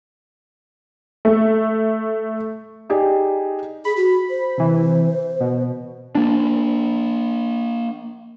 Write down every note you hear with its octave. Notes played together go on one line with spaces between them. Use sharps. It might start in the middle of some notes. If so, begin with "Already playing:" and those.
A3
D#4 G4 G#4 D5
G#4 B5
F#4
C5
C3 E3
B2
A#3 D4